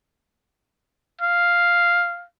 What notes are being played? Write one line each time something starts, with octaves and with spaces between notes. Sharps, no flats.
F5